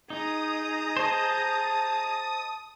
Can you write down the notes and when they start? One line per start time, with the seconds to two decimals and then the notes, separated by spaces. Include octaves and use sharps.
0.10 D#4 G#4 A#5 D#6
0.97 C5 D#5 A5